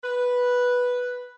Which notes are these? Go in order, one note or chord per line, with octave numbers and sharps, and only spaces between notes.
B4